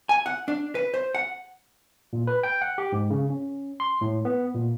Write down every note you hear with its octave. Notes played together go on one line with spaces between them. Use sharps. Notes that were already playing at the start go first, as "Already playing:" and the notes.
G#5
F#5
D4
B4
C5
F#5
A#2
B4
G5
F#5
G4
G#2
C#3
C#4
C6
A2
B3
A#2